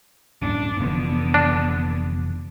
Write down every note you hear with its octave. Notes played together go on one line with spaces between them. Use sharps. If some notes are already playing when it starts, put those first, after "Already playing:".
D1 G2 C#4 D4
F1 D3 E3 F3 B3
D4